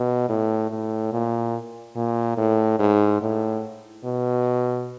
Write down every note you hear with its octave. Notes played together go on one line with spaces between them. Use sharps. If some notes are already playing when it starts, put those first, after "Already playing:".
Already playing: B2
A2
A2
A#2
A#2
A2
G#2
A2
B2